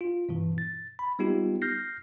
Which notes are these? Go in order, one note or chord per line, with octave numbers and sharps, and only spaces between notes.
F4
G2 B2 E3
A6
B5
G3 B3 D#4 F4 G4
F6 G6 A#6 C7